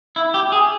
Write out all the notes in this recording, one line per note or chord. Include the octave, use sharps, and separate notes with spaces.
E4
G4
G#4